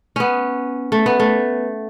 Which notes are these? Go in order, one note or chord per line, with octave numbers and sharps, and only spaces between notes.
B3 C#4
A3
B3
A3